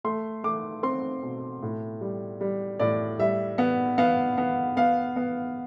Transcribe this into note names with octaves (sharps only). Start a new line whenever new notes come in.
A3 C6
A3 D6
C4 C6
B2
A2
G3
G3
A2 D5
G3 E5
B3
B3 F5
B3
B3 F5
B3